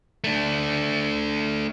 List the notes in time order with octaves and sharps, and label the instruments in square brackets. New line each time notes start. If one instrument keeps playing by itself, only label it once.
[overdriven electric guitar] A3 D4